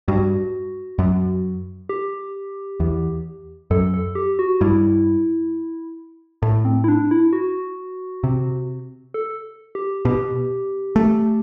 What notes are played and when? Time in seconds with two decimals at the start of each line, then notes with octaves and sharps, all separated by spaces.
0.08 G2 F#4
0.99 F#2
1.89 G4
2.80 E2
3.71 F#2 A4
3.94 A4
4.15 G4
4.39 F#4
4.61 G2 E4
6.43 A2 A3
6.65 C4
6.84 E4
6.88 D4
7.11 E4
7.33 F#4
8.24 C3
9.14 A4
9.75 G4
10.05 B2 G4
10.96 A3